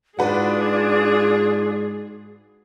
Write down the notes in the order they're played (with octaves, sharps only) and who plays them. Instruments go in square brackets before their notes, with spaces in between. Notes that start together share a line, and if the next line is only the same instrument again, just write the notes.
[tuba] G#2 [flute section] D4 F4 D5 [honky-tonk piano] F#4 B4 [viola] G#4